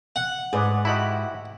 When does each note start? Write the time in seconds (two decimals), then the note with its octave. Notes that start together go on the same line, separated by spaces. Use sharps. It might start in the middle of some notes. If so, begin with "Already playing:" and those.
0.16 F#5
0.53 G#2 G#4 B4 D5
0.85 E4 F#4 G4 D#5 A5 B5